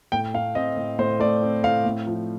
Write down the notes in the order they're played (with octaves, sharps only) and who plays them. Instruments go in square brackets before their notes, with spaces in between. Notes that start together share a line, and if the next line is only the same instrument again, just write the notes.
[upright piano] A2 G5
A3 F5
C4 D#5
A2
A2 C5
A3 D5
C4
A2 F5
A2
F3